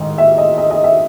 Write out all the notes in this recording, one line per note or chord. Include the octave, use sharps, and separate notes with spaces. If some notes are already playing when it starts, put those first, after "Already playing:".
Already playing: A1 G#2 D#3
E5
D#5
D#5
D#5
E5